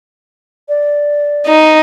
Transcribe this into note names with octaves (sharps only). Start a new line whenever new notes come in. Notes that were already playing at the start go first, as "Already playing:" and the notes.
D5
D#4